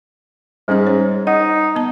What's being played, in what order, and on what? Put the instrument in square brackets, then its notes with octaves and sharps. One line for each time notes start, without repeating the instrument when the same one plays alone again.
[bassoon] G#2 [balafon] G3 C#4 G#4
[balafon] C#5
[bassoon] D#4 [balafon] F#5
[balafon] B3 A5